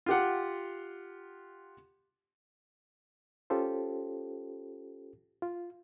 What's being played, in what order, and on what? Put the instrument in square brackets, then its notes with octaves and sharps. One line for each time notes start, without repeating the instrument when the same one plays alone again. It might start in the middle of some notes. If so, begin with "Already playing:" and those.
[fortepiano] F4 G4 F#5
[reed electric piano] C#4 F4 G4 A4 C5
F4